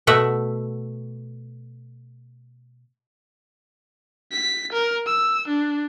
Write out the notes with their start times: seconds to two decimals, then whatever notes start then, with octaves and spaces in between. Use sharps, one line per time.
0.07 B2 A3 E5 F#5
4.32 B6
4.72 A#4
5.06 E6
5.48 D4